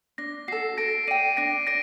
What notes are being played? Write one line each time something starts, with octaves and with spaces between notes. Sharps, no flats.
D4 A#6
F#4 A4 C7
A4 A#6 D7
D5 G5 C7 D#7
D4 A#6 D7
D5 A#6 D7